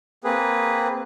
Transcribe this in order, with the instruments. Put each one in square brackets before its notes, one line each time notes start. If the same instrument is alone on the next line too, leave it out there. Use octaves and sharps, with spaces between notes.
[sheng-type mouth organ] A#3 C4 G#4 B4